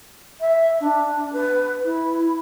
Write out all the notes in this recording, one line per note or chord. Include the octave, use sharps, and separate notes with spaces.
E5
D4
B4
E4